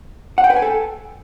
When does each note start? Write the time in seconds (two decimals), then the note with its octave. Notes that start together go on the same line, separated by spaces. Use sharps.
0.38 F#5
0.44 G5
0.50 B4
0.56 G#5
0.62 A4